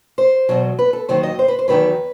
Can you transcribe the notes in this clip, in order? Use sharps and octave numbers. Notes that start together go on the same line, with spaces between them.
C5
E2 B2 F#3
B4
A4
D#2 D#3 F#3 C5
D#5
C5
B4
C5
E2 D#3 F#3 B4